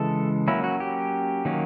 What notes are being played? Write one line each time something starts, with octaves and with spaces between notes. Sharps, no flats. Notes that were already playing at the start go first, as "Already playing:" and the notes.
Already playing: C#3 E3 G#3 A4
F#3 A#3 C#4 E4
F#4
G4
D#3 F#3 A#3 C#4